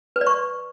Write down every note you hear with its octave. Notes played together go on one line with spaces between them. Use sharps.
B4
D5
C#6